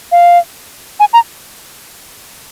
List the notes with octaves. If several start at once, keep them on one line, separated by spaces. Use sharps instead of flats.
F5
G#5
A#5